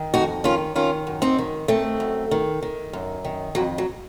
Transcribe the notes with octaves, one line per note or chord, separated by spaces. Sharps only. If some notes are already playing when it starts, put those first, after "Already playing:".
Already playing: D#3
F2 D#4 F#4
D#3 C#4 F4
D#3 C#4 F4
F#2
C4 D#4
D#3
D#3 A3 C4
F#2
D#3
D#3
F#2
D#3
F2 F#3
F#3